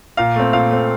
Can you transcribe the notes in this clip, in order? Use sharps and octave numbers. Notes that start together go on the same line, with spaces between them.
A#2 F5
A3 C4
A#2 F5
A3 C4